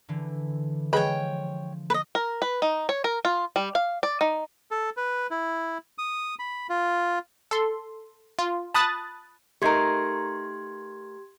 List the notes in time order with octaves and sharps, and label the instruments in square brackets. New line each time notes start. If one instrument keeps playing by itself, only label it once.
[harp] D3 E3
[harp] F3 [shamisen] G#3 B4 B5 [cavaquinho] C#5 G5
[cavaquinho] B4 D#5
[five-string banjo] A#4
B4
D#4
C#5
A#4
F4
G3
F5
D5
D#4
[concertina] A4
B4
E4
D#6
B5
F4
[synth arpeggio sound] A4 C6
F4
A5 B5 D#6 F#6 A6
[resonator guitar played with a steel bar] A3 D#4 A#4 [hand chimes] G4 C6 G#6